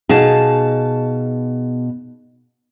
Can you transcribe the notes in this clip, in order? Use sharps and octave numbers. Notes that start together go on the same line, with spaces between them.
B2 D#4 G#4 F5 A5